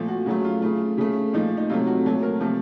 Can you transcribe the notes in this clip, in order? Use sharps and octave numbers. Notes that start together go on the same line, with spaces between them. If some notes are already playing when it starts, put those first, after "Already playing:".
Already playing: A#2 F3 A3
F#4
C#3 F#3 A3 F#4
F4
C#3 A3
C#3 A3
A#2 F3 A3 D#4
D#4
C3 F#3 A3 F4
F#4
A#2 F#3 A3 A4
A#4
C3 F3 A3 A4